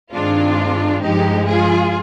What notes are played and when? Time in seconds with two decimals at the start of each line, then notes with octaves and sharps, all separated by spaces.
0.12 G2 D#3 G#3 C4 D4 F4
1.02 G2 F3 G#3 D#4 G4
1.47 F4 G#4